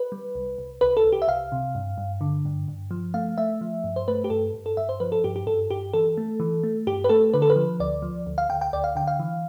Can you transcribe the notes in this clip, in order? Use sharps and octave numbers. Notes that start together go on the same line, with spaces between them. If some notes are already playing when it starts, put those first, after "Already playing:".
Already playing: B4
G3
C2
C2
C2 B4
A4
C2
G4
E5
C2 F5
C3
G2
G2
D3
G2
G2
F3
A3 F5
A3 E5
F3
G2
C5
A3 B4
G4
G2 A4
G2
A4
G2 E5
C5
F3 B4
A4
G2 G4
G4
G2 A4
G2 G4
E3 A4
A3
E3
A3
G2 G4
B4
A3 A4
D3 B4
A4
B4
F3
D2 D5
F3
D2
F5
D2 G5
G5
D2 D5
F5
D3 G5
F5
E3